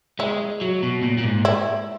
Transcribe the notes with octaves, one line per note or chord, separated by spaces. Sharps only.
G#3 E4
F#3
B2
A#2
A#2
G#2
E4